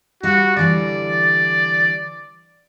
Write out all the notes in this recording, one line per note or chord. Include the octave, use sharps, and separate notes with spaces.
G3 F#4 F5
D3 E3 G3 D5